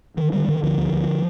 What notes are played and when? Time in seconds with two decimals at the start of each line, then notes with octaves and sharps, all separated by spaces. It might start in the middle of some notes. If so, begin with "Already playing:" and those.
0.17 D3 D#3
0.32 D3 D#3 G3
0.48 D3 D#3
0.63 D2 D3 F3
0.78 D2
0.93 D2